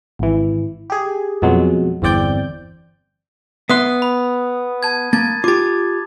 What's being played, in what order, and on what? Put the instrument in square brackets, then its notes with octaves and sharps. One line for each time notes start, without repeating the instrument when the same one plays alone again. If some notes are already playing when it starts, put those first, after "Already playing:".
[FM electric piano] G#1 E3
G4 G#4
F2 B2 F#3 G#3
G1 E2 C4 D5 G5 G6
[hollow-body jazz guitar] B3 E5 C6 [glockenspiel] D#6 F#6
[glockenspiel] B5
A5 G#6
[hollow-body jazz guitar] A#3 [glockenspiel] A5 G#6 A6
[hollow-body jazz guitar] F4 G4 [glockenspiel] D6 A6